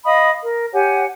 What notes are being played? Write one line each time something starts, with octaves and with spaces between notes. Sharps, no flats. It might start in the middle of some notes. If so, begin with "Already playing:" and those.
D#5 F5 B5 D#6
A#4
G4 C#5 F#5 G#5